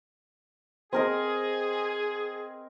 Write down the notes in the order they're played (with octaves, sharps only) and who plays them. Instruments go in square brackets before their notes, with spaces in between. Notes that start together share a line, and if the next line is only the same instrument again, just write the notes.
[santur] C4 A#4 D#5 [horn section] G#4